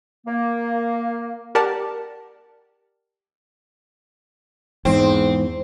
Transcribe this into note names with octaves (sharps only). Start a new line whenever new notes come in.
A#3
G4 A#4 D5 F#5 A5
E2 G#2 C4